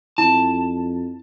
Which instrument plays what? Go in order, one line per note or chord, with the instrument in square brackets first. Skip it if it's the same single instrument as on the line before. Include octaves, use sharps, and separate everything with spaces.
[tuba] F2 [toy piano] E4 [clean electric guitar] A5